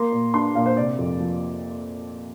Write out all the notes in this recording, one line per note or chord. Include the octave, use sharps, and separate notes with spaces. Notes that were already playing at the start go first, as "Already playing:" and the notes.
Already playing: A#3 C6
A#2
D4 C6
A#2 F5
C5
C3 D5
F2
F3